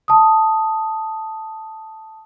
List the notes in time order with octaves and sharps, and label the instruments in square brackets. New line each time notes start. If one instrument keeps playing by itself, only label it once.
[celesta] A5 D#6